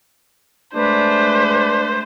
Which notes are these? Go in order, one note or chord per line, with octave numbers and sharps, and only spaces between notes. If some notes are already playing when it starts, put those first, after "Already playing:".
G#3 A3 D4 B4 C5